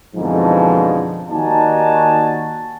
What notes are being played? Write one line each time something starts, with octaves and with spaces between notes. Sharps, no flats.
F2 G#2 B2 D3 E3 F3
D#2 D#4 F#4 D5 G#5 A5